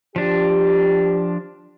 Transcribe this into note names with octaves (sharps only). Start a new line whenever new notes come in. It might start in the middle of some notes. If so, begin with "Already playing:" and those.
F3 D4 G4